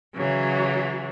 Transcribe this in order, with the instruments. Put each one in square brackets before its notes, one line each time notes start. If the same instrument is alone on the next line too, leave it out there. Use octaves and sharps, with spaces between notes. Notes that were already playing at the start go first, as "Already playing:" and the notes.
[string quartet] C#3 E3 F#3